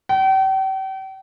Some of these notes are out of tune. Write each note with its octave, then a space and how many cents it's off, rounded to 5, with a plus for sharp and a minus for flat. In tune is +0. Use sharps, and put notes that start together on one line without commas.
G5 -40